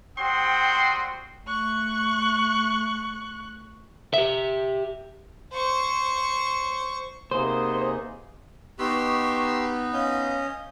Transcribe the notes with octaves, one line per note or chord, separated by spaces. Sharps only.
G3 C4 F#4 G5 C6 D#6
A3 C#6 F#6
G4 E5
C5 C#6
C3 A#3 B3 D#4 G#4 C5
B3 D#4 G4 C6 C#6 E6
C#4 D#5 F5 G6